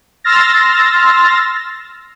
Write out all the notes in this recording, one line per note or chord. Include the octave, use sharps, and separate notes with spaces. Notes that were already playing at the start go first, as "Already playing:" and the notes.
C6 E6 F6 A6 A#6